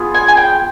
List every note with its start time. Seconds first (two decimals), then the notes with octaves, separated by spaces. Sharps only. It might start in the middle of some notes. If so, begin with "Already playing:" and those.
Already playing: B3 F4 G#4
0.14 G#5
0.28 G#5
0.37 G5